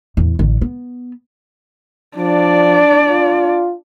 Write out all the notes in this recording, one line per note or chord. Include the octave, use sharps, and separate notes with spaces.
E2 A2
A1 D3
B3
F3 D4 D5
F4